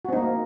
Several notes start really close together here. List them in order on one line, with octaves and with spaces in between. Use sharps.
F#4 C4 D#4 A#3